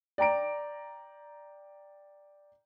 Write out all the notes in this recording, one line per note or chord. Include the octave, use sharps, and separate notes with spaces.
D5 G5 A#5 D7